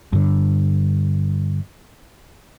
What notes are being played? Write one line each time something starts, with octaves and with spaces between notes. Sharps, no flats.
G2 D3